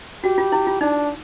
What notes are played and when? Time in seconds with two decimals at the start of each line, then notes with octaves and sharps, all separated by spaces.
0.24 F#4 G4
0.38 F4
0.52 E4
0.67 F4
0.81 D4 D#4